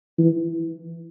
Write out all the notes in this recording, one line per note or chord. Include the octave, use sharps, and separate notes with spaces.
E3